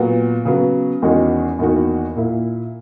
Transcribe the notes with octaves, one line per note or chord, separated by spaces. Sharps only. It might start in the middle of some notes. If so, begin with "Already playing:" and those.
Already playing: A#2 F#3 B3 F#4
C#3 F#3 B3
E2 D#3 G#3 C#4 F#4
E2 D#3 A#3 D#4 F#4
A#2 A#3 E4